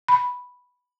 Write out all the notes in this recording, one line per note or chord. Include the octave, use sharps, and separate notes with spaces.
B5